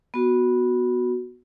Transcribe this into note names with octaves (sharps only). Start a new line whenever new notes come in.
B3 F#4